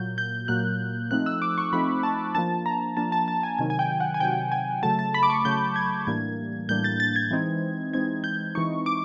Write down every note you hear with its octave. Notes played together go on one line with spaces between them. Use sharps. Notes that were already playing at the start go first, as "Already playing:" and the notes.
Already playing: A#2 F#3 A#3 G6
G6
A#2 F#3 A#3 F#6
F3 A3 C4 D#4 F#6
E6
D6
C#6
F3 A3 C4 D#4 B5
A5
F3 A#3 D4 A5
A#5
F3 A#3 D4 A5
A5
A5
G#5
C3 D#3 F#3 G#5
G#5
G5
F#5
G#5
C3 D#3 F#3 G5
G#5
C#3 F#3 A3 A5
A5
B5
D6
C#6
C#3 F#3 A3 G6
G#6
A2 E3 G3 A#3 D4 G#6
A2 E3 G3 A#3 D4 G6
A6
A6
G#6
E3 G#3 C4 D#4
E3 G#3 C4 D#4 G#6
G6
E3 G#3 C4 D#4 C#6
D6